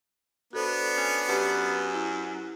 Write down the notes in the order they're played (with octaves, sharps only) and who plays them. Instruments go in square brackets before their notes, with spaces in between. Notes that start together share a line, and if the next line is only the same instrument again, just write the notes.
[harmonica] B3 D4 [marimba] F#4 A4 C5
[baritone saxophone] C#4
[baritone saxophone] F#2 [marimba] G4 B4 A5
[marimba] E4